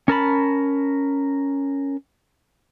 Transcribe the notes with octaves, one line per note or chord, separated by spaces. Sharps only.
C#4 A#4 A5 B5